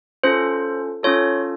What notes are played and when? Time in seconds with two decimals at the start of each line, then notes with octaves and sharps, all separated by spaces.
0.24 C#4 F4 A4 C5
1.03 C#4 F4 A4 C#5